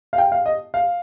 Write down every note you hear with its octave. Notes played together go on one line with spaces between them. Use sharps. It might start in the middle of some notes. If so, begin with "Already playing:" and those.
F5
G5
F5
D#5
F5